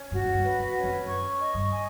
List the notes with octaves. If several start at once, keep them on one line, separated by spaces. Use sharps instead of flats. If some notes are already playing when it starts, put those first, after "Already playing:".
Already playing: C#4
G#2 F#4
G#2
G2
B4
F2
C#4
F2
F#2 C#6
D#5
G2
G#5